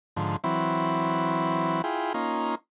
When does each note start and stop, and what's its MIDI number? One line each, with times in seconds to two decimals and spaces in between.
0.17 0.36 44
0.17 0.36 50
0.17 0.36 53
0.44 1.82 52
0.44 1.82 54
0.44 1.82 60
0.44 1.82 64
1.84 2.13 64
1.84 2.13 65
1.84 2.13 68
1.84 2.13 79
2.14 2.55 58
2.14 2.55 61
2.14 2.55 63
2.14 2.55 65